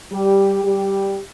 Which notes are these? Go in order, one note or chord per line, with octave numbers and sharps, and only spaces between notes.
G3 G4
G3 G4